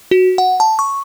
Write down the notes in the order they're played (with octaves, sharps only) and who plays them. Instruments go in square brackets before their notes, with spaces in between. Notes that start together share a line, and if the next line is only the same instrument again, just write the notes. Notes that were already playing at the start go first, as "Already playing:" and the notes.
[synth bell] F#4
F#5
A5
C#6